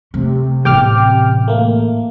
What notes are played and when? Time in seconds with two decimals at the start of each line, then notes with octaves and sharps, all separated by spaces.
0.14 C3 A3
0.65 A1 G5 D6 F6
1.48 A3 A#3